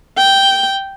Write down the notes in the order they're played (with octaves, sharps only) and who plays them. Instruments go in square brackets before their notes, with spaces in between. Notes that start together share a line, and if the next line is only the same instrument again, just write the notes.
[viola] G5